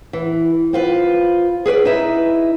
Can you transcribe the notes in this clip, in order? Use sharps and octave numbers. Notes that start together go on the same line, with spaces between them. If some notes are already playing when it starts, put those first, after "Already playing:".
E3
C4 F4 B4
G#4 B4 C5 D5
D#4 E4 B4 D#5 E5